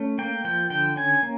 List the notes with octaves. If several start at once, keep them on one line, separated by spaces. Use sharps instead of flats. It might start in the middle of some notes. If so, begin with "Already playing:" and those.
Already playing: A3 C#4
A#3 G5
F3 G5
D3 G5
C#4 G#5
A#3